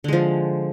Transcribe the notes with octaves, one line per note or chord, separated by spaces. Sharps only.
D3 F3 G#3